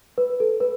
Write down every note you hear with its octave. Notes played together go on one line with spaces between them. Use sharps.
B4
A4
B4